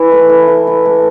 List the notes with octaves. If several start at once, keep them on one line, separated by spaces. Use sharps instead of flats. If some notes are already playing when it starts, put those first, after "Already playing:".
Already playing: E3 E4
A3
E3
E3
E4
A3